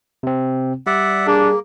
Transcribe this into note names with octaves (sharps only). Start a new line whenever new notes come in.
C3 C4
G3 D5 E5 F#5
A#3 D4 G#4